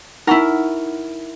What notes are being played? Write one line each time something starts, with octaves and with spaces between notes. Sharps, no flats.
D#4 E4 A#4 F#5 C#6